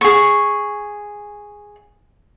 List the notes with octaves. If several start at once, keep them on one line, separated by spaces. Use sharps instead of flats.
G#4 C#6